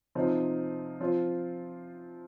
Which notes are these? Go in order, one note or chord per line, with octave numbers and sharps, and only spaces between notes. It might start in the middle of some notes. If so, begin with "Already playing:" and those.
C3 F3 C4 D#4
F3 C4 F4